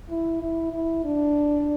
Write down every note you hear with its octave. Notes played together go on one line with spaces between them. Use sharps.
E4
E4
E4
D4